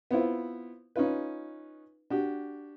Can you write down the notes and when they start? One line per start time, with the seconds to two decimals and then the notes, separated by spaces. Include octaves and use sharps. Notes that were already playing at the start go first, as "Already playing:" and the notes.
0.11 B3 C4 E4 F4
0.96 C#4 D#4 F4 B4
2.10 D4 F#4 G4